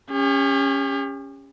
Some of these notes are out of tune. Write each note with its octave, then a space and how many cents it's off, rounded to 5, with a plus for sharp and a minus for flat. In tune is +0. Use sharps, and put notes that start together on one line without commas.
C#4 +0 G4 +40